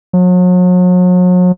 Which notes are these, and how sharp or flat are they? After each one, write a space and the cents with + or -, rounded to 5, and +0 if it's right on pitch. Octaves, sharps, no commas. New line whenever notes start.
F#3 -40